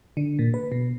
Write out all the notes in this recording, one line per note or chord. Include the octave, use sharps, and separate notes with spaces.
D3
A#2
B4
B2